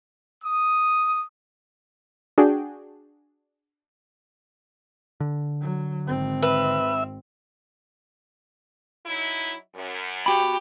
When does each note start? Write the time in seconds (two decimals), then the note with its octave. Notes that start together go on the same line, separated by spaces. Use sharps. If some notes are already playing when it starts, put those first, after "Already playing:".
0.43 D#6
2.38 D4 F#4 G#4 G5
5.20 D3
5.61 F#3
6.06 G#1 C4
6.42 B4 E5
9.05 F#3 D#4 E4
9.75 F#2
10.26 F#4 G4 B5